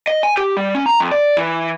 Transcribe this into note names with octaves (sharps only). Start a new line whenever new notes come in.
D#5
G#5
G4
G3
C#4
A#5
F2
D5
E3